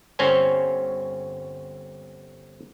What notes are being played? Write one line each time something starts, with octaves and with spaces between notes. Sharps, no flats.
G1 C4 C#4 C5 C#5 G#5